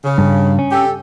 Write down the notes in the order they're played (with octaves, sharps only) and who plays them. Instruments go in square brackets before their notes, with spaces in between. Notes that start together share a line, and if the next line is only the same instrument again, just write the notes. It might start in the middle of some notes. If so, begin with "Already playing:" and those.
[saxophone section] C#3
[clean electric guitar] G2
C#4
[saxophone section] G4 A4